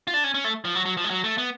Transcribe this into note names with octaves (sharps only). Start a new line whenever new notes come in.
F4
D4
C#4
C#4
A3
F3
F#3
F#3
F3
G#3
F#3
A3
B3